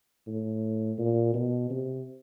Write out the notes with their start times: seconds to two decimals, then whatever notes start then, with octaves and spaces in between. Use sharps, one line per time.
0.27 A2
0.99 A#2
1.34 B2
1.70 C3